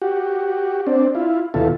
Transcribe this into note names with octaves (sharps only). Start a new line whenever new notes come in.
F#4 G4
C4 D4
E4 F4
D#2 B2 E4 F4 A4